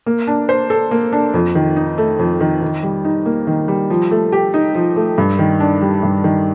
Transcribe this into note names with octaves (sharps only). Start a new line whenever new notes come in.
A#3
D4
C5
A4
A#3
D4
F2
D#3
D#4
A3
F2
D#3
D#3
G3
D#4
A#3
D#3
G3
F3
A3
G4
D#4
F3
A3
G2
D#3
D4
G3
G2
D#3